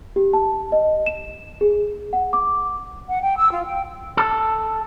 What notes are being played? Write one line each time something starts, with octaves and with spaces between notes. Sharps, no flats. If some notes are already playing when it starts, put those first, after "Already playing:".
G4
A5
D#5
E7
G#4
F#5
D6
F#5
G5
E6
F4
G5
A4